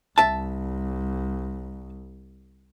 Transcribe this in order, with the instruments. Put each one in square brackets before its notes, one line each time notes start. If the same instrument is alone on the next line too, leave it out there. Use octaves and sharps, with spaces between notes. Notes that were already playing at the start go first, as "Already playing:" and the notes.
[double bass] C2 [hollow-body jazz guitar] E5 A5